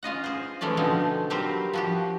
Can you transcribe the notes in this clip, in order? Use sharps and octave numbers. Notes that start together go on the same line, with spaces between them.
C#4 F4 D#5 F#5
G#4 C5
E3 G#3 A3 C#4 D5
B2 D3 F3 G#3 C4 D#4
F#3 G3 C4 G4 A#4 C5
F3 F#4 G4